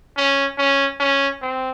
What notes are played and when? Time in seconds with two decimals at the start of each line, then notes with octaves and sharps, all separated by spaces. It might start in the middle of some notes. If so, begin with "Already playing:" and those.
0.17 C#4
0.58 C#4
1.00 C#4
1.42 C4